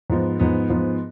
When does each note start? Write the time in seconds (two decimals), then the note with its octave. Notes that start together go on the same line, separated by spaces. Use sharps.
0.10 G#2 F3 B3
0.40 G#2 F3 B3
0.70 G#2 F3 B3